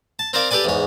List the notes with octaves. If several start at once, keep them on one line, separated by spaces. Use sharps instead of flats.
A5
C4 A#4 C5 D5 F5
G4 A4 B4 D5 G#5
E2 G#2 C#5